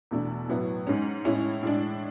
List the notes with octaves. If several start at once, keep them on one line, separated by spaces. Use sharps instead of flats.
E2 B2 A3 D4
A2 F#3 B3 E4
G#2 G#3 C#4
A2 G#3 C#4 E4
A2 G#3 D4